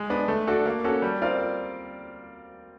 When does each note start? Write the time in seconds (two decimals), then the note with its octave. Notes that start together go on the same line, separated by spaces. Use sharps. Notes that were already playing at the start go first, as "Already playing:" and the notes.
Already playing: G#3
0.10 B3 D4
0.28 A3
0.47 D4 F#4 A4
0.66 A#3
0.84 C#4 F#4 A4
1.02 G3
1.21 C4 F4 A#4 D5